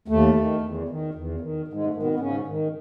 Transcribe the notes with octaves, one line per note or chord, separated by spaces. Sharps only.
D#2 A3
D#3
E2
D#3
E2
D#3
G#2
G#3
A3
D#3
B2 B3
B3
G#2 C#3 C#4
D#3